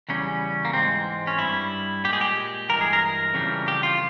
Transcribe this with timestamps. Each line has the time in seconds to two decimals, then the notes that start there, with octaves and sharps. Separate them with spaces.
0.09 E2 C#3 G3 C#4
0.65 A#3
0.73 G#2 E3 G#3 C4
1.27 C#4
1.38 G2 G3 E4
2.04 A#2 G4
2.09 G#3 G#4
2.21 G4
2.69 G2 E3 G#3 A#4
2.81 G#4
2.93 A#4
3.34 F2 C#3 E3 G3
3.68 G4
3.83 F4